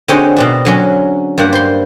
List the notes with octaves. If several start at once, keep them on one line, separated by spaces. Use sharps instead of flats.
D3 C4 D#4 F#4 G#4 C#5
B2 C4 D4
D3 F#3 C#4
G2 G3 A#3 F#5
C5 C6